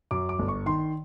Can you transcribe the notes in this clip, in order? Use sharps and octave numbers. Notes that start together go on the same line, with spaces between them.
F#2 D6
D6
G1
C#6
D#3 C6